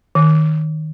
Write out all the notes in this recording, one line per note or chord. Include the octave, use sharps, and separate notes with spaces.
D#3